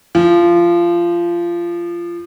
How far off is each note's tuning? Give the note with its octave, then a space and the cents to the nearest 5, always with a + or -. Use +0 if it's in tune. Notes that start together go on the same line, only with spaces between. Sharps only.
F3 -20